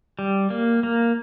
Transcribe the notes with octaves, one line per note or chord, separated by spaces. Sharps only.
G3
A#3
A#3